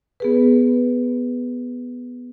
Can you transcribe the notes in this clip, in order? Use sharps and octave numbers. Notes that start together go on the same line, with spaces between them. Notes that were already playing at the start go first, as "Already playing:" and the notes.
B3 G#4 B4